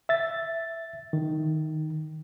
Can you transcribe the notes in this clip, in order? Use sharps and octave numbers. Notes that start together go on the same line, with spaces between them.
E5 A6
D#3